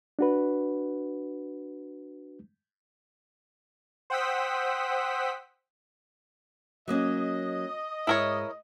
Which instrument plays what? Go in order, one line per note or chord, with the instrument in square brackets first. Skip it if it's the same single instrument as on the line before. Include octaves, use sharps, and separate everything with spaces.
[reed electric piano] D4 F#4 B4
[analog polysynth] C5 F#5 G5 D#6 E6 B6
[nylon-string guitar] F#3 A#3 C#4 [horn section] D#5
[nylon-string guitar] G#2 [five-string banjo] E4 A#4 C#5